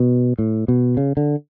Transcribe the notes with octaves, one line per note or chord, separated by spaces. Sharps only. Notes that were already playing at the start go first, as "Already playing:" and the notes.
Already playing: B2
A2
B2
C#3
D3